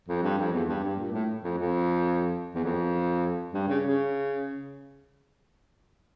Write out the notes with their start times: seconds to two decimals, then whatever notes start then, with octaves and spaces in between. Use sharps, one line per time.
0.08 F2
0.23 G2
0.38 F2
0.53 E2
0.69 G2
0.83 G2
0.99 A#2
1.13 A2
1.44 F2
1.58 F2
2.55 E2
2.64 F2
3.54 G2
3.68 C#3
3.84 C#3